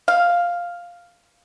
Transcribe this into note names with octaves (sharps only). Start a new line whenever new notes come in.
F5